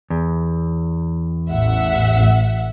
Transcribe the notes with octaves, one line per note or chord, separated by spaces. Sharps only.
E2
A1 E5 F#5